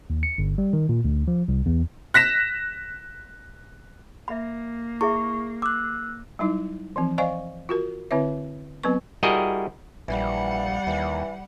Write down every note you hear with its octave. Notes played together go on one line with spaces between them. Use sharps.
D#2
C#7
G1
G3
D#3
A#2
D2
F3
C2
E2
F#6 A#6 B6 E7
A#3 E5 B5
E4 G#4 E5 C#6
D6 E6 F#6
F#3 G3 D#4 E4
E3 F3 C4
C5 D5 D#5 F5 G#5 C#6
F4 F#4 A#4
D3 C4 E4 B4 C#5 E5
F#3 B3 C4 B4 C#6
G3 E4 F#4 G#4 A#4 D#5
A#1 E3 G3 F#5
D#2 E3